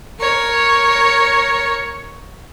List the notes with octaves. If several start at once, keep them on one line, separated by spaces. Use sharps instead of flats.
A#4 C#5